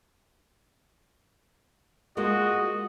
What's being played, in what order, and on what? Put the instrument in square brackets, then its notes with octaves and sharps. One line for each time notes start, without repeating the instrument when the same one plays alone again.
[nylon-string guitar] G#3 A#3 F4 [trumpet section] F#4 D#5